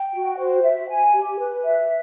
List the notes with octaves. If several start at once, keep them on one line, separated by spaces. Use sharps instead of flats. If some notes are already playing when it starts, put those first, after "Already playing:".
Already playing: G5
F#4
C5
E5
G#5
G4
B4
E5